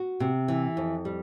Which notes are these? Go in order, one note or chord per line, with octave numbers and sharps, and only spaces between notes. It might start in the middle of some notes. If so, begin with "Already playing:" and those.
Already playing: F#4
C3
E3
F2
G3